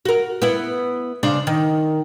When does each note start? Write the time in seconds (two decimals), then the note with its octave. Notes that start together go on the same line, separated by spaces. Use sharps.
0.05 F#4 A#4
0.42 B3 E4
1.23 C#3 D4 C5
1.47 D#3